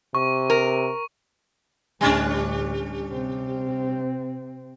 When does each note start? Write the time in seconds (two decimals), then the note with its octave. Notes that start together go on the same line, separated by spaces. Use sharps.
0.15 C3 C#6
0.50 A#4
2.01 D2 A2 G3 C#4 D4
3.11 C3 C4